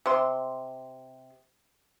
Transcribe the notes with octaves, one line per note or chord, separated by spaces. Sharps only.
C3 C6